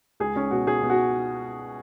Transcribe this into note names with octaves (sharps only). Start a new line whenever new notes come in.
C#2 G#4
C#2 C#4
B2 F#4
B2 G#4
B2
F#4